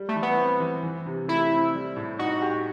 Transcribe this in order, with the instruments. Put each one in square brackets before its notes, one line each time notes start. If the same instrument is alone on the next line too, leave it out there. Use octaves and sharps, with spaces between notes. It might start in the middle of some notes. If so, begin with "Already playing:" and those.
Already playing: [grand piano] G3
[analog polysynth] A3
[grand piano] E3
[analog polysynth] B3
[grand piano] C4
E3
E3
C3
[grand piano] A3 [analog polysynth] E4
[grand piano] C4
G3
A2
[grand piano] D#4 [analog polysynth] F#4
[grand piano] G4